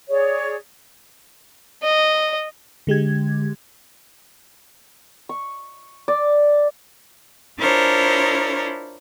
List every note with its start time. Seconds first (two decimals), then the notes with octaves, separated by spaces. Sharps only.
0.10 G#4 C#5 D5
1.83 D#5
2.87 D3 G#3 G4 G#6
5.29 C#6
6.08 D5
7.58 D4 E4 F4 A#4 C5 C#5